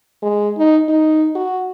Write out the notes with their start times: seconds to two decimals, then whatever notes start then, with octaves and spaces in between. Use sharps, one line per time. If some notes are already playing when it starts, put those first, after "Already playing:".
0.22 G#3
0.58 D#4
0.89 D#4
1.35 F#4